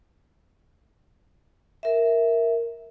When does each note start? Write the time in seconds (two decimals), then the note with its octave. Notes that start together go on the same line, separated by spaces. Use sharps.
1.83 A#4 E5